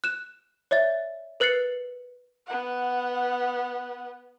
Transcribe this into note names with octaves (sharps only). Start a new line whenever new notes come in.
F#6 E7
C#5 D5 E5 A6
A#4 B4 F#6 A6 C7 C#7
B3 F#5